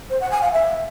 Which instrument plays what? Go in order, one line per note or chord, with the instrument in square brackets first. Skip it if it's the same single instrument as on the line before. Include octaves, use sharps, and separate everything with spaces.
[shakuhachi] C5
F#5
G#5
F5
E5